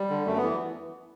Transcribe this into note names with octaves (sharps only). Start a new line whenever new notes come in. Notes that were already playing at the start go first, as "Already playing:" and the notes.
Already playing: G3
D3
F#2 A3
B3
E3